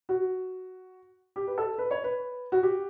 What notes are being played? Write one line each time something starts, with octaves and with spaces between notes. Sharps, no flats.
F#4
G4
B4
A4
B4
C#5
B4
F#4
G4